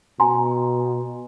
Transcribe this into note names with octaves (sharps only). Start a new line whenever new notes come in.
B2 G#5 A#5 C6